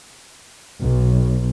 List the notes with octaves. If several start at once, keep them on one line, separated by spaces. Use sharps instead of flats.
B1